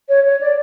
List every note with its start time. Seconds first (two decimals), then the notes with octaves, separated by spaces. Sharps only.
0.09 C#5
0.25 C#5
0.41 D5